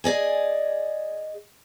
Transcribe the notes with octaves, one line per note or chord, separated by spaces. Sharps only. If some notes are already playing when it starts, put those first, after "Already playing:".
G#4 D5 D#5 G#5